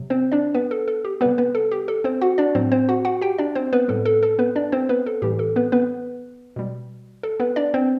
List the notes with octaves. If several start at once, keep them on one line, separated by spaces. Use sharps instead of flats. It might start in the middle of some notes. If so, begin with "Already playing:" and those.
Already playing: C3 F#3
C4 C5
D4 D5
B3 B4
A4
A4
G4
C3 G3 B3 B4
B3 B4
A4
G4
A4
C4 C5
F#4 F#5
D4 D5
A2 F#3 C4 C5
C4 C5
F#4 F#5
F#4 F#5
G4 G5
D4 D5
C4 C5
B3 B4
A2 G3 A4
A4
A4
B3 B4
D4 D5
C4 C5
B3 B4
A4
A2 E3 G3 G4
A4
B3 B4
B3 B4
B2 G3
A4
B3 B4
D4 D5
C4 C5